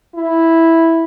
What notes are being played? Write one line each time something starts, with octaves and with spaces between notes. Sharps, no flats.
E4